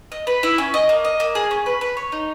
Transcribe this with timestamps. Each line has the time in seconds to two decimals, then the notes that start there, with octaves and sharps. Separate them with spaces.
0.12 D#5
0.27 B4
0.43 E4
0.58 C#4
0.74 D#5
0.89 A#3
1.05 D#5
1.20 A#3
1.35 G#4
1.51 C#4
1.66 B4
1.81 B4
1.97 C#5
2.12 D#4